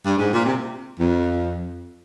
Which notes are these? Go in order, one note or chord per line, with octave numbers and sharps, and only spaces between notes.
G2
G#2
A#2
C3
F2